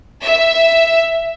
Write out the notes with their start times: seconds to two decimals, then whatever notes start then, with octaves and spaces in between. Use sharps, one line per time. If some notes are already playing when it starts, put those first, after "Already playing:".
0.23 E5